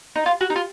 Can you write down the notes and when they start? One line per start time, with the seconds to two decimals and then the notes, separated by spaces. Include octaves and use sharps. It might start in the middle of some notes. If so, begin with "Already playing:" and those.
0.16 D#4
0.26 F4
0.41 F#4
0.50 D#4
0.56 F4